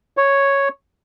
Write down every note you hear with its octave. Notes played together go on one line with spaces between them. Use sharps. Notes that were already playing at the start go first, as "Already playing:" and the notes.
C#5